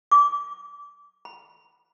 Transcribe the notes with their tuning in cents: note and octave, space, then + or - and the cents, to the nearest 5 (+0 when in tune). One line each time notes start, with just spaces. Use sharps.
D6 -25
B5 -5